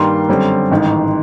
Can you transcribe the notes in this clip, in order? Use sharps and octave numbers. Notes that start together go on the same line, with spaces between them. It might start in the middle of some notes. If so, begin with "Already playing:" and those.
Already playing: G2 D#3 G3 A#3 C6
F#2 D3 G3 C4
A1 G#2 D#3